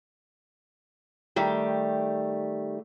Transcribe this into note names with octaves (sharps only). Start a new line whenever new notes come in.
D#3 G3 A3 G4